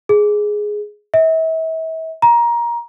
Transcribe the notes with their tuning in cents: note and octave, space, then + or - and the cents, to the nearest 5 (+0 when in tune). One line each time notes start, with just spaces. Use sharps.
G#4 +5
E5 -40
A#5 +20